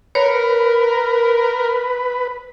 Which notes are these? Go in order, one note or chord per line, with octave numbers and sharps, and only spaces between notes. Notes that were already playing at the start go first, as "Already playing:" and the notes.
A#4 B4 C#5